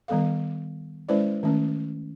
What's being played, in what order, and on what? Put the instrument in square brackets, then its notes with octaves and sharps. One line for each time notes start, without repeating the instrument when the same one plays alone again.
[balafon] D#3 G3 B3 A4 F5
G#3 C#4 E4 B4 C5 D5
D#3 A3 C#4